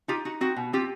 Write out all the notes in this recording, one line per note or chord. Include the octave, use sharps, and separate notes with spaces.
D#4 F4 G4
D#4 F#4
C4 F#4
B2
C4 F4 G4